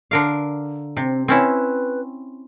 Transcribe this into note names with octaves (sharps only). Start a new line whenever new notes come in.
D3 A#4 F5
C3 C4
C4 C#4 E4 B4